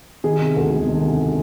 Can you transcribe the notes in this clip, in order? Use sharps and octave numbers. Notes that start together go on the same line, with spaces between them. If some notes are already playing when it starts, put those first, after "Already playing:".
D#3 G#4
C3
D2
E1
D#3
C3